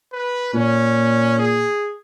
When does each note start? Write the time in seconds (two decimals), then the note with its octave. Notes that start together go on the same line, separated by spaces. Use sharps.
0.13 B4
0.54 A#2 C#4
1.39 G#4